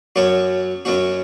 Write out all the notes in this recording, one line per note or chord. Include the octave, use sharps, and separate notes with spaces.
F#2 F#3 C#4 F#4
F#2 F#3 C#4 F#4